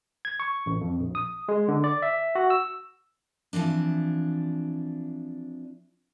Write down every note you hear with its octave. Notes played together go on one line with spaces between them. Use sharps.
G#6
C#6
A1
F2
A#1
D#6
G#3
D3
D5
E5
F#4
E6
E3 F3 C4 D4